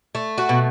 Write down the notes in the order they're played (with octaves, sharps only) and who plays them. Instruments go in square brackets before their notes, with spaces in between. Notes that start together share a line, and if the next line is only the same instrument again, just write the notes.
[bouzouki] A3
F#4
B2